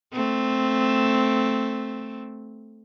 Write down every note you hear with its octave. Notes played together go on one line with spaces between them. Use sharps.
A3 C4